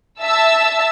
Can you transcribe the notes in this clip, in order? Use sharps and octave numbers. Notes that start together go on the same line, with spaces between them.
E5 A5 E6